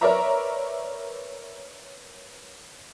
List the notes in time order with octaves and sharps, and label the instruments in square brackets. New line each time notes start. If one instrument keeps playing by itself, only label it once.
[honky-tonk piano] A#4 B4 C#5 D5 E5 A#5